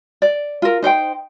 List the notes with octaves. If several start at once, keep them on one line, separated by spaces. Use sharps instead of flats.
D5
F4 A#4
D#4 C5 C#5 G5